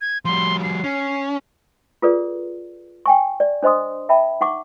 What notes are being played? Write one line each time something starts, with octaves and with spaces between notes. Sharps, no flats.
G#6
F3 G3 C6
C7
C#4
F4 G#4 A4 B4 D5
G5 G#5 C#6
D5
D4 C5 D#5 C6 D#6
E5 G5 A5 B5
D#4 F#5 C#6 D6